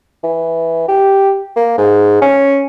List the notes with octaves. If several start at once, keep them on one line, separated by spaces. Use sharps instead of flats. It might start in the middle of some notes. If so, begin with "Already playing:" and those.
E3
G4
A#3
G#2
C#4